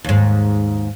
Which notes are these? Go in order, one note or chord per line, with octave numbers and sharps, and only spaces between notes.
D#2 G#2